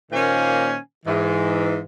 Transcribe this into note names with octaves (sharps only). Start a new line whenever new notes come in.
A#2 D#3 A#3 C#4 C5 G#5
G#2 E3